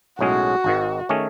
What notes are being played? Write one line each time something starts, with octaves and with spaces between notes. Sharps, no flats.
B1 A2 G#3 C#4 F#4 G#4
G#1 G#2 D#3
D#3 A3 C#4 G#4